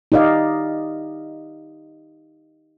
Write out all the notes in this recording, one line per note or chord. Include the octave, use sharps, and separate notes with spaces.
D#4 G4 D5 D#5 F5